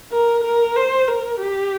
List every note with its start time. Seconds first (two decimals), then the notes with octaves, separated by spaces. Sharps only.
0.12 A#4
0.44 A#4
0.76 C5
1.07 A#4
1.39 G4